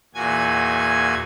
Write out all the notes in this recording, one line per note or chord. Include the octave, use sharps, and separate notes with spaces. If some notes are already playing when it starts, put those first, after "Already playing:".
E2 A#2 F#4 G#5 G#6